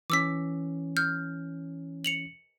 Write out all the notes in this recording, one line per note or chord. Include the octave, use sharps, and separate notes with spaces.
E3 C#4 D6 E6 B6
F6 G6
C#7 F7 F#7